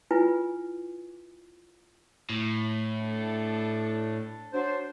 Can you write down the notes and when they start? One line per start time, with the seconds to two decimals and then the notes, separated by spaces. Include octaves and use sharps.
0.11 E4 F4 B4 G#5
2.30 A2
3.01 D4 A4
4.53 F#3 D4 C5